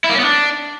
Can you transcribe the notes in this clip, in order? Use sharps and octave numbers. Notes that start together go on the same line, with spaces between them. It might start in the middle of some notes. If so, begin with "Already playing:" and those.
E4
A#3
C#4
B3
D4